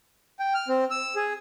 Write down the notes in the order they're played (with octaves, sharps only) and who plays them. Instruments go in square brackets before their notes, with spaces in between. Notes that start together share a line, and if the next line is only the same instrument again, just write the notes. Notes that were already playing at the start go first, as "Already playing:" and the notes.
[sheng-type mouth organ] G5
F6
C4
E6
G#4